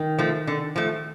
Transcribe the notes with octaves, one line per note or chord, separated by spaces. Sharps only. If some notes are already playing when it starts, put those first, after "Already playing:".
Already playing: D#3
F3 A3
D3
F3 A3